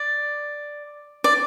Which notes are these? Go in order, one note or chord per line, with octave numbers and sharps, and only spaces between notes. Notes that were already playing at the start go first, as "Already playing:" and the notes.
Already playing: D5
D5